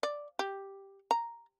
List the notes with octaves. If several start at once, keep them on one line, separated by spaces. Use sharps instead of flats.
D5
G4
A#5